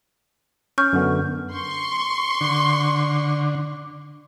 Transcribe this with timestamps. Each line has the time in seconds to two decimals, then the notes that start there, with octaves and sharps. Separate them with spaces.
0.78 C#4 C#6 F6 G6
0.93 F#2 D3 B3
1.53 C6 C#6
2.41 D3